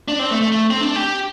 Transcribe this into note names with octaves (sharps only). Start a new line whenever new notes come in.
D4
C4
A3
A3
A3
C4
D4
G4